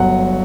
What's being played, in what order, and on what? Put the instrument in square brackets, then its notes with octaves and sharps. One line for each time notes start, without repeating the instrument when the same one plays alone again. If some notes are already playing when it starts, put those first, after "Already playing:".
Already playing: [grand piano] G1 G2 F#3 F#5